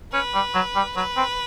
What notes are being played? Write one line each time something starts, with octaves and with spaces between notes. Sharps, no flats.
C#4 B4
G3
F#3
G3
F#3 B4
C4